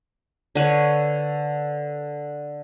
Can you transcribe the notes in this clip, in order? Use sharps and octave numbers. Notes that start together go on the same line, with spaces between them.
D3 B4 C#5